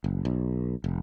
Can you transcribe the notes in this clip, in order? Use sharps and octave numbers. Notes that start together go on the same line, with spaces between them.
F#1
B1
F1